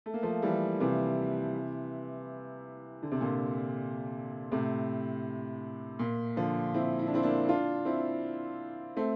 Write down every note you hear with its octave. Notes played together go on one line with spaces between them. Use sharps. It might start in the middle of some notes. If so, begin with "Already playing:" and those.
A3
A#3
F3 A3
E3 G3
C3 E3
D3
C3
A#2 D3
A2 C3
A#2
D3 F3
C4 E4
E4
D4
C4 E4
A#3 D4
D4 F4
C4 E4
A3 C4